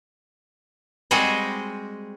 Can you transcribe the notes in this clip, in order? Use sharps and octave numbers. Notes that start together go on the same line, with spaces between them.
G3 G#3 C4 F#4 G#4 D#5